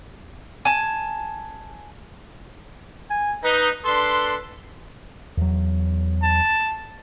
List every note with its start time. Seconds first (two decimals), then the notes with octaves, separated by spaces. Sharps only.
0.65 G#5 A5
3.10 G#5
3.44 D#4 B4
3.84 D4 A4 B4 C6
5.37 E2 F#3
6.23 A5